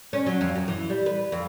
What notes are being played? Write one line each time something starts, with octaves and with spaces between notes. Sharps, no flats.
C#4
F#3
F2
F#2
E3
G3
B4
F2